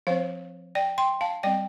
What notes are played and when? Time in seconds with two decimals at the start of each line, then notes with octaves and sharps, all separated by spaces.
0.07 F3 C4 C5 F5
0.75 D5 G5
0.98 G5 C6
1.21 F5 A5
1.43 G3 C4 D5 G5